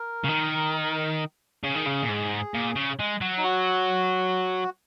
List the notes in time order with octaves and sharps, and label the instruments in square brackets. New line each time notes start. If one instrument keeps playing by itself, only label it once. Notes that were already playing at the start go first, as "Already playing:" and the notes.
Already playing: [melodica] A#4
[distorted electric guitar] C#3
D#3
[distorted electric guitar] C#3 [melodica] G#4
[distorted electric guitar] D#3
C#3
A#2
G#2
A#2
C#3
G#3
F#3
[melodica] D#4
F#4